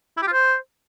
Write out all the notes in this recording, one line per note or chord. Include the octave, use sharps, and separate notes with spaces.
E4
G4
F4
C5